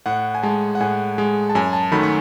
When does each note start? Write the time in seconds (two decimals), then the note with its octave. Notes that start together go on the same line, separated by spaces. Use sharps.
0.06 A2 F#5
0.35 G#5
0.43 G#3 A5
0.75 F#5
0.80 A2 G#5
1.18 G#3
1.50 A5
1.55 F#2 G#5
1.73 A5
1.92 D#3 F#3 A3 B5
2.03 C#6